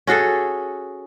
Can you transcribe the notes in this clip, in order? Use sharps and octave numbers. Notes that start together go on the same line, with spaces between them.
C#4 F#4 G#4 A4